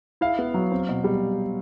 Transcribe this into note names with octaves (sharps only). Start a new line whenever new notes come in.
E4 F5
B3
F#3
C4
B2
G3